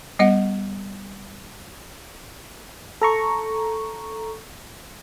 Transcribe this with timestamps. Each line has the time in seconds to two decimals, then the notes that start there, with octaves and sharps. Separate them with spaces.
0.19 G3 B3 D#5 F#5
3.02 A4 A#5 C#6